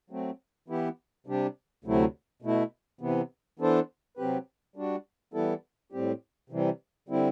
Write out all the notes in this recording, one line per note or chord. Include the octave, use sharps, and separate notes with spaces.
F#3 A3 C4
E3 B3 E4 G4
C3 G3 D4 G4
D2 C3 F#3 A3 E4
B2 A3 E4
C3 E3 B3
E3 B3 D4 A4 C5
C3 F#3 C4 G4 B4
G3 D4 F#4
E3 G3 B3 E4 A4
A2 G3 C4 G4
C3 E3 G3
D3 G3 C4 E4